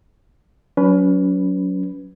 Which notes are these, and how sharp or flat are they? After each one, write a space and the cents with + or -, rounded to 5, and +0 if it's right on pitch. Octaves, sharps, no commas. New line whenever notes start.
F#3 +0 C#4 +30 B4 +0